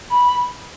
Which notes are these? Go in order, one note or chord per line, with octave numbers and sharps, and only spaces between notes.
B5